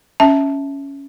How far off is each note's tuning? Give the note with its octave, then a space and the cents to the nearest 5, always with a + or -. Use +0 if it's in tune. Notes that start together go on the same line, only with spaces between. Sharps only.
C#4 +5 E5 -10 A5 +0